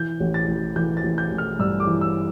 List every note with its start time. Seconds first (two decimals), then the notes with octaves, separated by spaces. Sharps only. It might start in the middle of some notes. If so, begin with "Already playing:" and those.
Already playing: E3 G6
0.20 A1
0.34 A6
0.48 A1
0.76 E3 G6
0.97 A6
1.03 A1
1.18 G6
1.31 A1
1.38 F6
1.59 G2 E6
1.80 D6
1.87 E3
2.01 E6